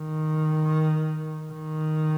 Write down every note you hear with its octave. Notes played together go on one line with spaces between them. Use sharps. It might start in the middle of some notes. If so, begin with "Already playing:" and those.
Already playing: D#3
D#3